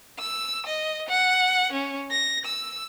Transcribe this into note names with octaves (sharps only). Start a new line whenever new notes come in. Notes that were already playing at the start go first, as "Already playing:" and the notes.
E6
D#5
F#5
C#4
A#6
E6